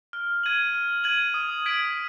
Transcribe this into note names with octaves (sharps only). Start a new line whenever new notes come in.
F6
G#6 D#7 F#7
F6
G#6 D#7 F#7
D#6
G#6 B6 D7 F#7